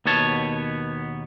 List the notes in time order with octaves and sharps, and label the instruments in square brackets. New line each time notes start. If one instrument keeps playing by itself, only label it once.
[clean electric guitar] D#2 B2 B3 C#5 A5